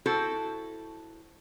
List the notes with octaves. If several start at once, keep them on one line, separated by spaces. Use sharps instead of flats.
E4 F#4 A4 C5